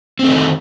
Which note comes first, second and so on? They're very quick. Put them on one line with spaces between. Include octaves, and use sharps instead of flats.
C4 A3 D#3